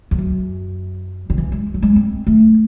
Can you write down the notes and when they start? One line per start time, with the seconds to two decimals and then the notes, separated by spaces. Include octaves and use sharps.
0.11 E2
0.18 F#2
1.30 D#3
1.38 E3
1.52 G#3
1.74 F#3
1.83 G#3
1.96 C4
2.27 A3